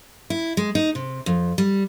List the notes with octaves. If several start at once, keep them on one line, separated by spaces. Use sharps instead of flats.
E4
G#3
D#4
C3
F2
G3